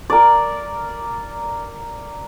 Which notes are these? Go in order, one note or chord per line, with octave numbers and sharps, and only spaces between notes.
A#4 D5